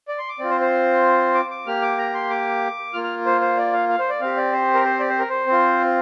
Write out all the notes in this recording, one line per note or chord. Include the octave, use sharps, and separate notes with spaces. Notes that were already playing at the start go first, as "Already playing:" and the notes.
D5
C6
D6
C4 F4 D5
C5
C5
D6
D6
A#3 G4 F6
D6
A#5
C6
D6
A#3 F4 F6
F6
C5
C5
D5
F5
F5
C5
D5
C4 G4 F5
D5
C5
A#4
C5
D5
C5
A#4
C5
C4 F4